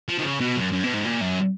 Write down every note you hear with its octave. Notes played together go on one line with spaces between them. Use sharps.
F3
D#3
C#3
B2
F#2
F#2
B2
G#2
A#2
F#2